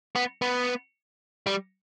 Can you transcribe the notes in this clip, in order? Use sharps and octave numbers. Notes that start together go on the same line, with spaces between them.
B3
B3
G3